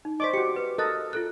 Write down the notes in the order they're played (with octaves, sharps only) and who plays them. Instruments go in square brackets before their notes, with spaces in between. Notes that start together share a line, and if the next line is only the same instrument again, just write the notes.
[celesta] D#4
[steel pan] C5 D5 D6 [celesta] D#5 C#6 B6
[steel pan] F#4 G4 [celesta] C#7
[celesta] B4
[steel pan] A4 A#4 D#5 [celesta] D#6 F#6 A6
[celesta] F4 A4 F#6